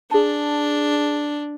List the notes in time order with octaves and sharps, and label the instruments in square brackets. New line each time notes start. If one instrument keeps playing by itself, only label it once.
[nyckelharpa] D4 [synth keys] G#4 A5